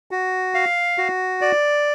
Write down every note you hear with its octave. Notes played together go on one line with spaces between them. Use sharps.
F#4
F5
F#4
D5